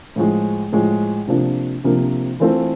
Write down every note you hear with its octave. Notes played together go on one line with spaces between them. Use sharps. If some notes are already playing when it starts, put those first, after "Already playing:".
A2 F3 G#3
A2 F3 G#3
C3 F3 A#3 D4
C3 F3 A#3 D4
E3 A3 C4 F4 A4